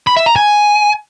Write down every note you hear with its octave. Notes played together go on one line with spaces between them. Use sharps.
B5
E5
A#5
G#5